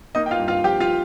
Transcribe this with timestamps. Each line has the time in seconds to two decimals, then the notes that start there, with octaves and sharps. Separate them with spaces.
0.15 A#3 D#4 D#5
0.26 G5
0.31 F4 F5
0.39 G2
0.48 F4 F5
0.64 F3 G4 G5
0.80 F4 F5